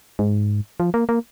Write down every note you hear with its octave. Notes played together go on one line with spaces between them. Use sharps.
G#2
F3
A#3
A#3